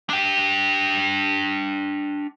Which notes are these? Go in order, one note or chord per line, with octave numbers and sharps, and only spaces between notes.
D4 G5